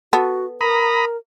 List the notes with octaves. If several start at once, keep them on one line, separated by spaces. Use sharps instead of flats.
B3 F#4 A4
A#4 A#5 B5 D#6